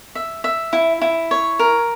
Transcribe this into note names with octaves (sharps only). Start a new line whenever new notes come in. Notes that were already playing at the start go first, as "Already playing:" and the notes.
E5
E5
E4
E4
C#5
A#4